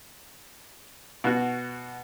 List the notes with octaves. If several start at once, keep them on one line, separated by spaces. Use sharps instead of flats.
B2 F#4